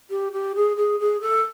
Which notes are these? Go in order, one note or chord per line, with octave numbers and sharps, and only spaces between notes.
G4
G4
G#4
G#4
G#4
A4